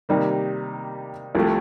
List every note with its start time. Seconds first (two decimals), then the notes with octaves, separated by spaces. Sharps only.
0.09 C3 D#3 G3 A#3 D#4
1.35 C2 C3 F3 A3